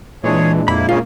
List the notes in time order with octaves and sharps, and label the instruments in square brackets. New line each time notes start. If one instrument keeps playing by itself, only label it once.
[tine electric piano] A#2 G#3 D4 [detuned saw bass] E3 [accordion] G#4 C#5
[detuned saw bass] F2 [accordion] A#3 E4 [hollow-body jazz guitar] B5
[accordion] F#2 C#3 C#4 [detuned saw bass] A#3 [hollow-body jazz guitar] F4